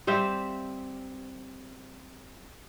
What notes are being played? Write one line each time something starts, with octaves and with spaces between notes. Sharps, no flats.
G3 C4 E5 F5